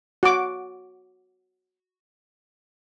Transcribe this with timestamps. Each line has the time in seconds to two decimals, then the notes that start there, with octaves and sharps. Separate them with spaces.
0.23 F#4 D6